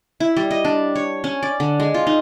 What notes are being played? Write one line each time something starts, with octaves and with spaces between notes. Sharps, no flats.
E4
G3
D#5
D4
C#5
C#4
D5
D3
G#3
F4
D#4